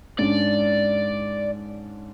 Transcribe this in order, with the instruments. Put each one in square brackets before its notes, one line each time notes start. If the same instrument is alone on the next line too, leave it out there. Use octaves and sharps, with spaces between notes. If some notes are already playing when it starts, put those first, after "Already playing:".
[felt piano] G#2 C#4 D4 [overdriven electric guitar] D5